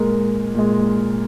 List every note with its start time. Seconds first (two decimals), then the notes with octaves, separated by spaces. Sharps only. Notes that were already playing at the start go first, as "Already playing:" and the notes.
Already playing: A#2 G#3 A#4
0.55 A#2 G#3